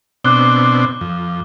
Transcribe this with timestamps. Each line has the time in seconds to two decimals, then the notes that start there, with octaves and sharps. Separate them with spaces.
0.25 B2 C4 D4 D6 F#6 G7
1.01 F2